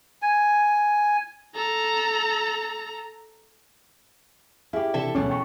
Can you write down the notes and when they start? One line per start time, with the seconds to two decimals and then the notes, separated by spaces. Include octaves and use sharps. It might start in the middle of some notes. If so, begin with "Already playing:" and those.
0.22 G#5
1.55 A4 A#5
4.73 E4 G4 G#4 F5
4.94 C3 E3 D4 A4 E5
5.15 D2 B2 E3 F#3 C#4
5.30 G5 A5 C#6